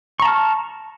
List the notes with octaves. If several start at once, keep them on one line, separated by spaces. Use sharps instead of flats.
A5 A#5 C#6 F6